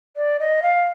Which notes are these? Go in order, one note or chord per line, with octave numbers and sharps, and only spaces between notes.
D5
D#5
F5